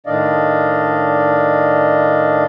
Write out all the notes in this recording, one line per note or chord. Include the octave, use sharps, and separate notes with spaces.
A2 D#3 D4 D5 D#5 F5